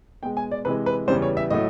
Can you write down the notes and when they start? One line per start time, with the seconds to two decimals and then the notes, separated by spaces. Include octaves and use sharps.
0.23 B2 G#3 G5
0.37 G#5
0.51 D5
0.65 C3 E3 G#3 B4
0.86 B4
1.08 E2 C#3 E3 G3 C5
1.22 C#5
1.37 E5
1.50 A2 F#3 A3 D#5